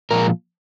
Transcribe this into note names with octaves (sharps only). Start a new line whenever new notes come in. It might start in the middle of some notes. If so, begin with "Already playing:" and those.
A#2 F3 G#3 A#4